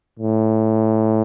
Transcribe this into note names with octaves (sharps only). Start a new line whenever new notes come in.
A2